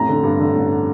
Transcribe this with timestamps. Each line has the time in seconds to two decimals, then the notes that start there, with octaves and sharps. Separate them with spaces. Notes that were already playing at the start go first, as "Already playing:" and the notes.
Already playing: A1 F2 A#5
0.09 D3
0.23 G2
0.40 D3
0.55 A1